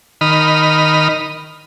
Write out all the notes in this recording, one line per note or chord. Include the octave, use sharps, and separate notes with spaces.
D#3 B5 D#6 F6